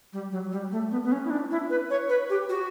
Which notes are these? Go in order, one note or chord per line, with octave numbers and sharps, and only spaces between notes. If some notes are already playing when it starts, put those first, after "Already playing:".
G3
F#3
G3
A3
B3
B3
C#4
E4
D4
E4
B4
C#5
B4
G4
F#4